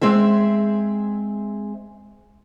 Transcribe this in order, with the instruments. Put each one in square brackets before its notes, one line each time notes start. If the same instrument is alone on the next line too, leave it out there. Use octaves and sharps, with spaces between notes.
[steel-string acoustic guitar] G#3 C4 G#4 E5